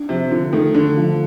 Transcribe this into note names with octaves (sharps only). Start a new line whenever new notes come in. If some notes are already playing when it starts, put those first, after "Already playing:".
Already playing: D4
C3 F3
D3 F4
D#3 A3
D3 D4
F3